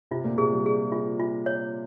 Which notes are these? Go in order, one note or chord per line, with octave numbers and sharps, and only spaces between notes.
C3 F4
A#2
C3 G#4
G3
G#4
F4
F4
C#5